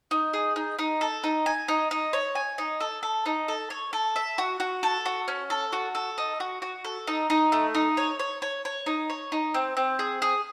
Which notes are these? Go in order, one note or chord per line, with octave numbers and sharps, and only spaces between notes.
D#4
G#4
D#4
D#4
A4
D#4
G#5
D#4
D#4
C#5
G#5
D#4
A4
A4
D#4
A4
C#5
A4
E5
F#4
F#4
A4
F#4
C#4
A4
F#4
A4
D#4
F#4
F#4
A4
D#4
D#4
A3
D#4
C#5
C#5
C#5
C#5
D#4
C#5
D#4
C4
C4
G#4
G#4